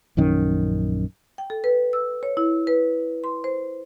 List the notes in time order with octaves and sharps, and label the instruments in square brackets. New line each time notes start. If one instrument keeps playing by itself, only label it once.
[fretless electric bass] A#1 F#2 D#3 C#4
[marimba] G5
A4
B4
E6
C#5
E4
B4
C6
C5